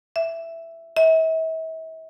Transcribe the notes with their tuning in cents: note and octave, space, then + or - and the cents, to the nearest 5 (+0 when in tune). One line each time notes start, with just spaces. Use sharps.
E5 +5
E5 -40